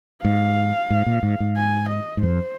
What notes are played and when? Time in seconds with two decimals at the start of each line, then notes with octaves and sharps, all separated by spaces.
0.24 G#2 F5
0.90 G#2
1.06 A#2
1.23 G#2
1.40 G#2
1.57 G#5
1.90 D#5
2.17 G#2
2.23 F2 C5